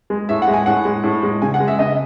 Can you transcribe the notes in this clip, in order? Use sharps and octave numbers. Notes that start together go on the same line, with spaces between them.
G#3
A2 E5
F#5
G#3
G#5
A2 F#5
G#3
A2
G#3
C#3 G#5
F#5
G#3
E5
C#3 D#5